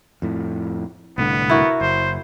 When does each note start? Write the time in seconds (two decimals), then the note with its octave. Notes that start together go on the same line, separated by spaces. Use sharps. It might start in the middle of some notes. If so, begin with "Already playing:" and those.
0.22 F2 A2
1.18 C2 A2 D3 B3
1.49 E4 F#4 A#4
1.81 F#1 C5